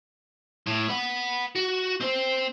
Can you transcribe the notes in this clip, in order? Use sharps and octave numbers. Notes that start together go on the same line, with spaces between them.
A2
B4 F#5
F#4
C4 C5